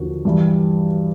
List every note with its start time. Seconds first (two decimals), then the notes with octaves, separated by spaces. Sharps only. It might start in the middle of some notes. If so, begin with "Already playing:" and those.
Already playing: D#2 D3 F3 F#4
0.25 G2 E3 G3